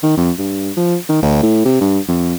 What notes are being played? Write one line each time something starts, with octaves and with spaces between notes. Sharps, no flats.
D#3
F2
G2
F3
D#3
D2
A2
C3
G2
F2